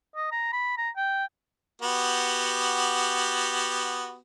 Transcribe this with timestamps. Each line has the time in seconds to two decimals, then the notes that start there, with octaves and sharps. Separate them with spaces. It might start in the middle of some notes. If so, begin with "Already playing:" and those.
0.16 D#5
0.32 A#5
0.53 B5
0.77 A#5
0.96 G5
1.82 B3 F#4 G4